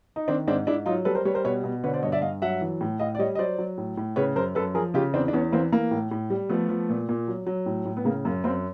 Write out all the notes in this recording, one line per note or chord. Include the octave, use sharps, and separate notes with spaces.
D#4
D#3 C4 D4
G#2 C4 D4
G#2 D4 E4
F#3 D#4 F4
G3 A4 B4
A#4 C5
G3 B4 C#5
A#4 C5
B2 B4 C#5
B2
D3 B4 C#5
C5 D5
G2 C#5 D#5
D5 E5
G2 D#5 F5
F#3 E5 F#5
E3
A2
A2 D#5 F5
D5
G3 C#5 D#5
D#5
F#3 C5 D5
F#3
A2
A2
C#3 B4 C#5
F#2 A#4 C5
F#2 A4 B4
F3 G#4 A#4
C#3 F4 G4
E2 C4 D4
D4
E2 B3 C#4
E3 A#3 C4
E3 A#3
A2
A2
G3
F3 A3 B3
F3
A#2
A#2
F#3
F#3
A2
A2
B3
C#3 A#3
F#2 A#3
F#2 A#3 C4